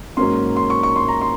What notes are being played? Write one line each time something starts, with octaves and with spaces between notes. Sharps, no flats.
G#2 F#3 A#3 C#4 C6
C6
C#6
C#6
C6
A#5
C6